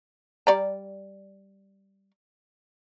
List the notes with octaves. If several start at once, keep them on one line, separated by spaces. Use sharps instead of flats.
G3 D5 A#5